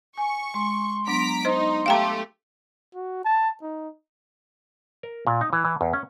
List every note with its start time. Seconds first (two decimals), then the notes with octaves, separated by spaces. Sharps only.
0.18 G#5 C#6
0.54 G#3 C6
1.07 F#3 B3 D4 A#5 B6 D7
1.45 D#4 C5 D#5 C6
1.86 A3 G4 F5 G5 A#5
2.95 F#4
3.25 A5
3.62 D#4
5.03 A#4
5.27 A#2
5.41 D#4
5.53 E3
5.65 E3
5.81 E2
5.93 C#4